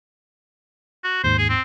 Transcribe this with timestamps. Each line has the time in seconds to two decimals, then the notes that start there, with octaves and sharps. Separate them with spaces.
1.04 F#4
1.24 D#2 G#2 C5
1.38 G#4
1.49 C4